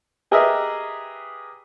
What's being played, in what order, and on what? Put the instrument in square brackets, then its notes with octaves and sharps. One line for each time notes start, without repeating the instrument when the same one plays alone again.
[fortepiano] G4 G#4 A#4 B4 D#5 E5